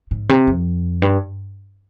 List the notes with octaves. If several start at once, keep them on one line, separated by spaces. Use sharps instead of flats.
G#2
C3
F2
G2